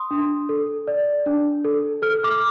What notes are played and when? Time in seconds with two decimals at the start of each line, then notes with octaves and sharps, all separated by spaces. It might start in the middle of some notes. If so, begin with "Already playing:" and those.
Already playing: C6 D#6
0.11 D4
0.49 A4
0.88 D5
1.26 D4
1.65 A4
2.02 A4 F6
2.23 D6 F6